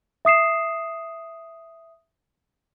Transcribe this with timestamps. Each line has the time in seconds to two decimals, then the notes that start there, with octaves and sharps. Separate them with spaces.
0.25 E5 D#6 C7 E7